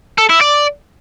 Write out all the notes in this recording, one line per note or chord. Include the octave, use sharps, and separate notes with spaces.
A4
E4
D5